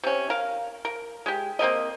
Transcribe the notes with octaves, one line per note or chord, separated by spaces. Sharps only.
C3 C#4
A#4 F5
A#4
G#3 G4
A#3 C4 A#4 D#5